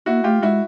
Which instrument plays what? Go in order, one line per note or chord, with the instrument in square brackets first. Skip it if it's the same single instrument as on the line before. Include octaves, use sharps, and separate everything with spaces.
[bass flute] A#3 [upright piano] E4 F#4
[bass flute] A3 [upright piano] F4 G4
[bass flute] G#3 [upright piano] E4 F#4